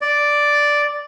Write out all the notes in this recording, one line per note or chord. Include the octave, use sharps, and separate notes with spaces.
D5